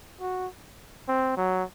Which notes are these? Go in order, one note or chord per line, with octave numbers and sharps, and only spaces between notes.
F#4
C4
F#3